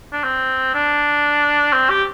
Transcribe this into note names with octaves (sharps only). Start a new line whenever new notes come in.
D4
C4
D4
C4
G4